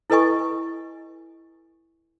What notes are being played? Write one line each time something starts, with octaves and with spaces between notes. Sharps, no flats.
E4 A4 B4 D#5 G#5 C#6